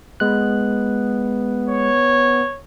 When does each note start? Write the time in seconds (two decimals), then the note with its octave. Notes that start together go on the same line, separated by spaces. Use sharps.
0.20 G#3 B3 F#6
1.69 C#5